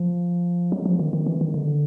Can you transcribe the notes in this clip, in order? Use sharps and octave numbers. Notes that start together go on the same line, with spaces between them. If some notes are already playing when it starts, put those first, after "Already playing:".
Already playing: F3
F#3
F3
D#3
D#3
E3
D#3
D3